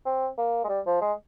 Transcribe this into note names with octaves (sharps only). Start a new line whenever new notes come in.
C4
A#3
G#3
G3
F3
G#3